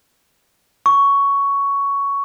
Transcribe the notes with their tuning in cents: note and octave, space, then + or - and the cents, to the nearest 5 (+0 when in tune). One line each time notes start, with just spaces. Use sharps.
C#6 +10